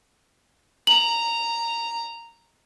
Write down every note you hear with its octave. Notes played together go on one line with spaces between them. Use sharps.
A#5 F#7